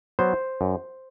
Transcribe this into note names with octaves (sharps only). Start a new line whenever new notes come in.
F#3 B3 C5
F#2